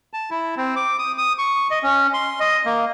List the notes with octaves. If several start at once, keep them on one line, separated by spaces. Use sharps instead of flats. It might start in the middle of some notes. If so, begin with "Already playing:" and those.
A5
E4
C4
D6
D#6
D#6
C#6
D#5
C#4
C6
D#5
A#3